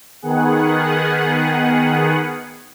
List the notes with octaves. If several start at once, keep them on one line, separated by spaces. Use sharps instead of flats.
D#3 B3 G#4 F#5